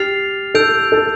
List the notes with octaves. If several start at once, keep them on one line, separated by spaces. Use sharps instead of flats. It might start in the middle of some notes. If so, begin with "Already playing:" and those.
Already playing: G4 F6 A6 C7 F7
A4 E6 G6 D7 F7
A4